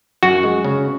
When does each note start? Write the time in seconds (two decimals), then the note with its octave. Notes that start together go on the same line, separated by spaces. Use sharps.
0.23 F#2 F#4
0.43 G#3
0.64 C#3